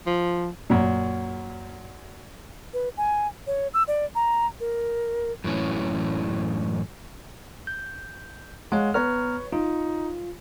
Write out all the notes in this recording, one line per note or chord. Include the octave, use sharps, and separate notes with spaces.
F3
F#2 A#2
B4
G#5
C#5
E6
D5
A#5
A#4
F#2 A2 E3 C#4
G6
G#3 C#5 F5 F#5
B3 B4 C#5 A#5 F6
D#4 F4